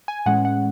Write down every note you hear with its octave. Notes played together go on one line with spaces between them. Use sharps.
G#5
A2 E3 G#3 C#4 F#5
F#5